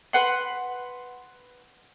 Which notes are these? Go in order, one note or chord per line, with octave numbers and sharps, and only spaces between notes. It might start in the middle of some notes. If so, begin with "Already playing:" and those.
B4 F#5 C6